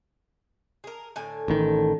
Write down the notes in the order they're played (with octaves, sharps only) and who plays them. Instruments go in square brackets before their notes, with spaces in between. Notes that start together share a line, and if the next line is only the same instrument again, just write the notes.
[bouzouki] G#4 A#4
A2 D3 G#5
[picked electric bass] A1 D#3